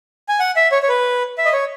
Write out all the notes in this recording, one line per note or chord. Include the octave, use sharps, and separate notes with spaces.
G#5
F#5
E5
C#5
C#5
B4
E5
D#5
C#5